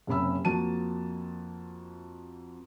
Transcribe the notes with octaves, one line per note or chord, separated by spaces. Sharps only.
F#1 C3 C#4 B5 E6
F2 F3 A#3 F#4 A5 D#7